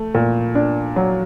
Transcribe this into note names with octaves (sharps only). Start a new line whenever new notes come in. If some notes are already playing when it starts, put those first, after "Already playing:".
Already playing: A3
A#2
D4
F#3